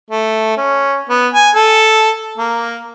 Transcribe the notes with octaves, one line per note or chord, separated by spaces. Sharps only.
A3
C#4
B3
G#5
A4
A#3